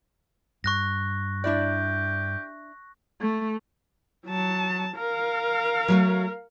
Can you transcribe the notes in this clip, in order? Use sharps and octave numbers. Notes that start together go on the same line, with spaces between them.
G2 C#6 F#6 A#6
D4 E4 G4 D5
A3
F#3 A5
A#4 F5
F#3 G#3 A3